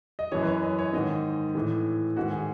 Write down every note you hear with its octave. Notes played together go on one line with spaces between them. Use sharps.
D#5
F#2 E3 C#5
B4
C#5
D#5
C#5
G#2 D#3 D#5
A2 E3
G#2 D#3 F#4
G#4